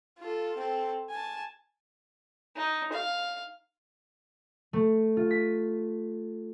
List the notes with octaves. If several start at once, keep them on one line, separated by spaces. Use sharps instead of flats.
F4 A4
C4 A4
G#5 A5
D#4
F5
A3
F4
B6